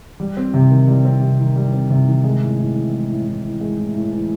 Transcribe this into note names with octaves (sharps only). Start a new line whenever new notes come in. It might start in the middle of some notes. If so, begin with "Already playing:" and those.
G3
C4
C3
D#3
G3
C4
C3
D#3
G3
C4
C3
D#3
G#3
A2
A2
E3
G#3
A2
A2
E3
G#3
A2
A2
E3